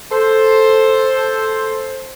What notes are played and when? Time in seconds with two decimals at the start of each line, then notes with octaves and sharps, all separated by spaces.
0.12 A4 C5